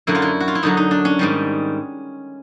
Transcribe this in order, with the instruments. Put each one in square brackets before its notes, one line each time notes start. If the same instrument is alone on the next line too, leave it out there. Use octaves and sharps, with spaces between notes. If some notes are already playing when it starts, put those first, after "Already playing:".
[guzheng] F#2 D3 F#3 E4
F4
E4
F#4
F4
E4
F#2 D3 F#3 D#4
D#4
D4
C#4
G#2 D#3 G3